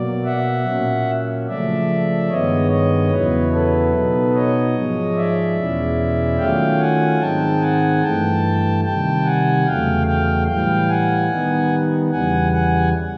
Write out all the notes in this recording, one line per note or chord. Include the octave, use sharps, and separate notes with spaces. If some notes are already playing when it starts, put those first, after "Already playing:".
Already playing: B2 F#3 A#3 D5
E5 F#5
A#2 F#3 A#3 C#4
C#3 F3 A3 D5 E5
G2 D#3 G#3 B3 C#5 D#5
C#5 D#5
E2 C#3 F#3 B3 E4 B4 C#5
A4 B4
B2 F#3 B3 D#4
C#5 D#5
G#2 F3 G#3
D5 E5
E2 B2 G#3 C#4 E4
D#3 F#3 A3 C#4 F4 F5 G5
F#5 G#5
G#2 D#3 G#3 C4 D#4 G5 A5
F#5 G#5
G2 E3 A3 G5 A5
C3 D#3 G3 G5 A5
F#5 G#5
E2 C#3 F#3 A3 F5 G5
F5 G5
A2 E3 G3 F5 G5
F#5 G#5
D#3 G3 B3 D#4
E2 C#3 E3 G3 F#5 G#5
F#5 G#5